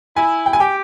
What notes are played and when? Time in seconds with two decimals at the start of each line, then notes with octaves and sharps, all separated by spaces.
0.16 E4 G#5
0.46 G5
0.53 G#5
0.60 G4 G5